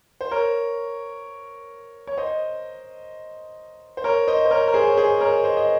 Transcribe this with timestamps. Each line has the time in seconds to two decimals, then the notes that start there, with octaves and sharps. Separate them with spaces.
0.21 C5
0.31 A#4 C#5
2.07 C#5
2.18 C5 D#5
3.97 C5
4.04 A#4 C#5
4.28 C5 D#5
4.45 C5
4.51 A#4 C#5
4.68 A#4
4.74 G#4 C5
4.88 C#5
4.97 G#4 C5
5.21 A#4 C#5
5.44 C5 D#5
5.57 D#5